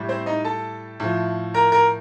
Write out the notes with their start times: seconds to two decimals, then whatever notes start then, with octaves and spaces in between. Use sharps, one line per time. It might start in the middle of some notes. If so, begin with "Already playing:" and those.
Already playing: A2 G3
0.09 C4 C5
0.26 D#4 D#5
0.45 A4 A5
1.00 A2 F3
1.54 A#4 A#5
1.72 A#4 A#5